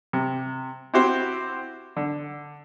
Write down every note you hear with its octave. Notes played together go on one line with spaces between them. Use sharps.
C3
C4 E4 F#4 G4 C5
D3